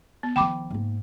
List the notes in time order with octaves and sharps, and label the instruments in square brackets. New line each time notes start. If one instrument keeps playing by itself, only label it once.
[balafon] B3
[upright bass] D#3 F3 [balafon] G5 B5 D6
[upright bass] G#2 A#3